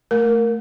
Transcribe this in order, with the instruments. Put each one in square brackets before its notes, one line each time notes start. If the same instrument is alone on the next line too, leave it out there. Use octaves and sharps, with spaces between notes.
[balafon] A3 A#4